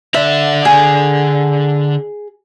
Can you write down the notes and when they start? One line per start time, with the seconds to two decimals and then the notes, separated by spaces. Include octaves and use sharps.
0.14 D3 D5 E5
0.65 G#4